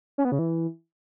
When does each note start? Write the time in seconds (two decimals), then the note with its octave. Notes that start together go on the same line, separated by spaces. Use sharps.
0.18 C#4
0.25 B3
0.32 C#3
0.39 E3